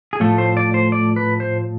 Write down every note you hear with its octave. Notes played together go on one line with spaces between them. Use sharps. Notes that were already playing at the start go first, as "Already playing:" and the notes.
G#4
A2 F3 A3 A4
C5
D5
C5
D5
B4
C5